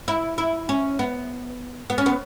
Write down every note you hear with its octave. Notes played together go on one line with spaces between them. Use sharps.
E4
E4
C#4
B3
B3
C#4
B3